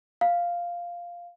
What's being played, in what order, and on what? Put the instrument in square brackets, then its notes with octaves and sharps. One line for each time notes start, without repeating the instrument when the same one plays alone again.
[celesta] F5